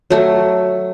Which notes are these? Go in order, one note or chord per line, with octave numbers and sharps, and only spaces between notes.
F#3 A3